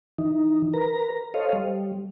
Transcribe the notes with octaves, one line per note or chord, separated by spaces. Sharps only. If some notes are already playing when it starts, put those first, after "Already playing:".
E3 D#4
A#4 B4 A#5
A4 C5 C#5 D#5 F5
G3